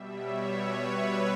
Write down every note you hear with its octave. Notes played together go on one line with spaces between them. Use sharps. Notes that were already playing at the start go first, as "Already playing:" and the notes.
Already playing: B2 G3 E5
C#5
B4